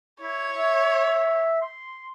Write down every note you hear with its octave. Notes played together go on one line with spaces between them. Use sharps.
E4 C#5
E5
C6